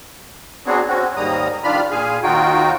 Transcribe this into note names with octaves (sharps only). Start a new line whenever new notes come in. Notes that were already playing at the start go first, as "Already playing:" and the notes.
F#3 B3 C4 D4 F#4 G#4
C4 C#4 F#4
D#2 G#2 G3 A#3 A#5 D#6
G2 D#3 D4 F4 B5 F6
A#2 G#4 F5 G#5
D#2 D#4 F4 F#4 G5